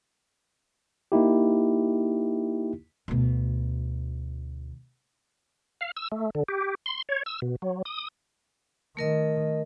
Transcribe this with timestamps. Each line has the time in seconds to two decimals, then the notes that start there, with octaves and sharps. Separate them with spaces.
1.12 A#3 D#4 E4 G4
3.08 D2 B2
5.81 F5
5.97 E6
6.12 A3
6.35 D3
6.48 G4
6.86 C6
7.09 C#5
7.26 E6
7.42 B2
7.62 F#3
7.85 D#6
8.97 D#3 A3 A#4 D#5